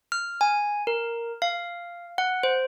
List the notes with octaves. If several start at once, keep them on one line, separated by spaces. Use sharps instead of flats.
F6
G#5
A#4
F5
F#5
C5